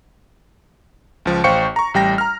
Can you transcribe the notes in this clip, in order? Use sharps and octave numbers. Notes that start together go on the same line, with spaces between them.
C#2 F3
A1 C5 F5 G5 C#6 C#7
A#5 C#6
A1 G3 G5 A#6
A#5 F6